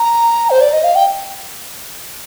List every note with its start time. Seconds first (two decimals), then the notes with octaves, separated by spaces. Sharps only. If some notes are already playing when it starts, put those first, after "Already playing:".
Already playing: A#5
0.50 C5
0.61 D5
0.73 D#5
0.84 F5
0.95 G5